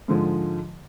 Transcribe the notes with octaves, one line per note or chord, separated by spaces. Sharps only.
G#2 D3 F3 G#3